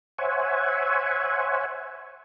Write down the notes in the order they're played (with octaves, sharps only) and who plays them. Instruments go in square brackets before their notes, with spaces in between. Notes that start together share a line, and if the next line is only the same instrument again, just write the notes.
[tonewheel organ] C5 C#5 E5 F#5 G#5